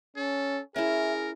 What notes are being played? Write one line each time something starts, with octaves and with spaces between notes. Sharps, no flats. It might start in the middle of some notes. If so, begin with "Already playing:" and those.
C#4 A4
C#4 E4 G#4 A#4 E5